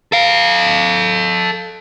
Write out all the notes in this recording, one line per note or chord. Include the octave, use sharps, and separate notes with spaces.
A4 F5